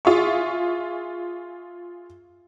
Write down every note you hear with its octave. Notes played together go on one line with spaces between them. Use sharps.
F4 G#4 E5 C#6